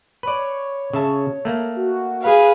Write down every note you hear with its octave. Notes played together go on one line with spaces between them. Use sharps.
B4 C#5 D5
C#3 E5 A5
A3 A#3
F#4
G#4 B4 F5